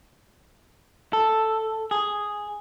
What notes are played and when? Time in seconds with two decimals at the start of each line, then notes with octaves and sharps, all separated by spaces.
1.13 A4
1.91 G#4